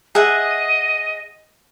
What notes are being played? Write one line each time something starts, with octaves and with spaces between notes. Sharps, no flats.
G#4 D#5 E5 F#5